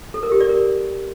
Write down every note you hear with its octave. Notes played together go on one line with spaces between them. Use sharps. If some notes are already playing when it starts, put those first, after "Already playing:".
A4
A#4
G4
D5
A#4